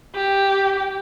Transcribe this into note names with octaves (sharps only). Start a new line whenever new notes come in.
G4